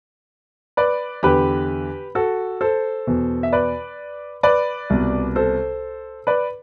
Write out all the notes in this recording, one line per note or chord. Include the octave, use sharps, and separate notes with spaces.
B4 D5
E2 D3 G4 B4
F#4 A4
A4 C5
E2 B2
E5
B4 D5
B4 D5
C2 B2
A4 C5
B4 D5